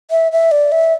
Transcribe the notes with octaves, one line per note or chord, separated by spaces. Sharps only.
E5
E5
D5
E5